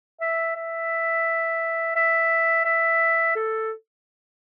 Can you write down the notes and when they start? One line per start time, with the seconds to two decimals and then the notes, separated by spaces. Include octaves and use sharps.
0.21 E5
0.56 E5
1.96 E5
2.65 E5
3.36 A4